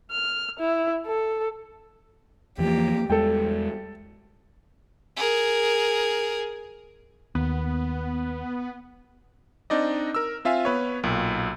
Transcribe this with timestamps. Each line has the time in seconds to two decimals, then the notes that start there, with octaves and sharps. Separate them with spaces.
0.11 F6
0.59 E4
1.06 A4
2.58 E2 E3 F3 A#3 G4
3.10 E2 G3 G#3 A4 G5
5.17 G#4 A#4
7.35 D#2 B3
9.70 C4 D4 D#4 D5 D#5
10.15 A#4 E6
10.45 C4 F4 E5 F5 G#5
10.65 B3 B4 C#5
11.03 B1 A#2